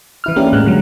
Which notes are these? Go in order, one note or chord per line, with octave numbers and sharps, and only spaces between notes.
E3 E4 F6
A#3 C#4 D4 G4 A#4
A2 G#3 F#6
D3 F#3